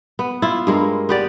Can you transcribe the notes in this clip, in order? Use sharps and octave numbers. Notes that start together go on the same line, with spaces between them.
B3
E4 F4
G2 G#3 A#3
B3 G4 D5